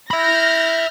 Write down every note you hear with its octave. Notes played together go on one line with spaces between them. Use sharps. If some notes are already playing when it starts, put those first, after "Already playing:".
E5 B5 F6 G6 A#6